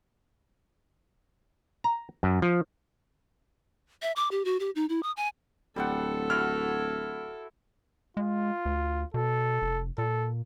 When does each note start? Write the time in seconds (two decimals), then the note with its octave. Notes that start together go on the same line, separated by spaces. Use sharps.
1.84 A#5
2.23 F#2
2.42 F3
4.02 E5
4.16 D6
4.31 G4
4.45 F#4
4.60 G4
4.75 D#4
4.89 E4
5.03 D#6
5.17 G#5
5.76 D1 G3 A4 C5 F#5
6.30 E4 F#4 F6
8.17 G#3 F4
8.65 D2
9.14 B2 A4
9.62 F1
9.98 A#2 A4